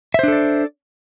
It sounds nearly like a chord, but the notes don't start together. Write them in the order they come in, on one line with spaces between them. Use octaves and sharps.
E5 C5 D4 A4 D5